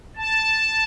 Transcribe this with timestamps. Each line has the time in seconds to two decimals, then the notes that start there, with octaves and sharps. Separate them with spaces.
0.17 A5